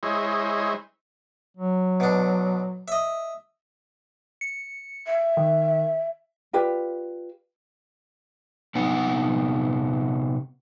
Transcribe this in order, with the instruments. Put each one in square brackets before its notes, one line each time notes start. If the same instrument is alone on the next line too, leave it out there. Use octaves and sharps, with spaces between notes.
[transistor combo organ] G#3 E4 C5 C#5 D#5
[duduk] F#3
[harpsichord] B2 D4
D#5 E5
[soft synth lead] C#7
[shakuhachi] E5
[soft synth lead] D#3
[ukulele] F4 G4 B4 D5
[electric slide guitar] C3 B3 D#4 F#5